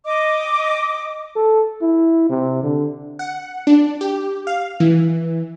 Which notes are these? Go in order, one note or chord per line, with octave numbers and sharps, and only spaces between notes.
D#5 D6
A4
E4
C3
D3
F#5
D4
G4
F5
E3